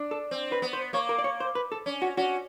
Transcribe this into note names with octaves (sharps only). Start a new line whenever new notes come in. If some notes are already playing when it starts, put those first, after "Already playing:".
Already playing: D4
A4
C4
B4
B3
C5
A#3 C#5
A#4
D5
C#5
C5
B4
A4
C#4
F#4
C#4 F#4